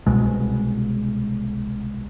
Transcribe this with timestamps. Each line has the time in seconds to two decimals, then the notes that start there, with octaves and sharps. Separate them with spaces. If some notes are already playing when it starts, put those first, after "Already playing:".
0.07 C2 B2 G#3